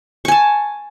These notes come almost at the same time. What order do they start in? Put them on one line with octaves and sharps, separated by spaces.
C#6 G#5 A5